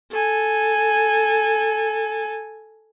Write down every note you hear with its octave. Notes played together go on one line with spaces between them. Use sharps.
A4 G#5